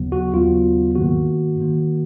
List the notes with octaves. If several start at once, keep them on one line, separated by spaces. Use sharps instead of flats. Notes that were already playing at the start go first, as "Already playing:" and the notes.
Already playing: D#2 C#3 F#3 B3
F#4
D#2 C#3 F#3 B3 F4
G#2 D#3 A#3 F#4
G#2 D#3 A#3